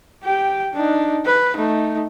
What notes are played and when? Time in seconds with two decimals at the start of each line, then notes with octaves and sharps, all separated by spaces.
0.23 G4 G5
0.73 D4 D#4
1.25 B4
1.57 A3 D#4